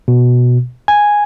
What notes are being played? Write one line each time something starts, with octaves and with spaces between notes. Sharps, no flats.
B2
G#5